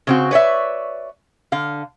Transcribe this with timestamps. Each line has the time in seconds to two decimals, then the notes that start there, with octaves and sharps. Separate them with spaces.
0.07 C#3 C4 F#4
0.31 B4 C#5 D5 E5
1.52 D3 F5